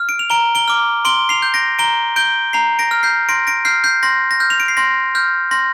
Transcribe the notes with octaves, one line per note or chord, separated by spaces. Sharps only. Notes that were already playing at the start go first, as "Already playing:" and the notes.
Already playing: F6
D7
F7
A#5 D7 G7
D7 G7
D6 F6
C6 D7 G7
C7 F7
G6
A#6 D7
A#5 D7 G7
G6 D7 G7
A#5 C7 F7
A#6 D7
F6
G6 C7
C6 A#6 D7
A#6 D7
F6 G6 C7
G6 C7
C6 A#6
A#6
F6 G6
F7
D7
C7
C6 A#6
F6 G6
C6 A#6